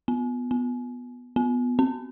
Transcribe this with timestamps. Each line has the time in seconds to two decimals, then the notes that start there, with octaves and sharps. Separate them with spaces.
0.08 B3
0.51 B3
1.36 B3
1.79 C4